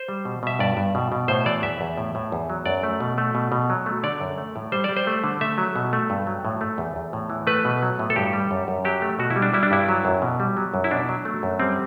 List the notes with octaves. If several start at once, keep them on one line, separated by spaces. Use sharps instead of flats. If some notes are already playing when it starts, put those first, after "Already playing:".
Already playing: C5
G3
B2
B2 E5
G2 D5
G2
B2
B2
A2 C5
E3 D5
E2 E5
E2
A2
A2
E2
F#3
F#2 D5
A3
B2
A3
B2
B2
F#3
A3
D3 D5
F#2
A3
A2
G3 C5
G3 D5
C5
A3
D3
A3 E5
F#3
B2
A3
G2
F#3
A2
A3
E2
E2
A2
E3
A3 B4
B2
F#3
A2
A4
G2 G4
G3
F#2
F#2
F#3 G4
A3
B2 F#4
E4
G3
D4
G3 E4
D4
G2 E4
F#3
F#2
B2
G3
F#3
F#2
E4
B2 D4
F#3
A3
F#2
G3 C4